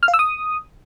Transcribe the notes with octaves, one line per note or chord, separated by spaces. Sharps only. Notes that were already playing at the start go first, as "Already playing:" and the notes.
F6
F5
E6
D#6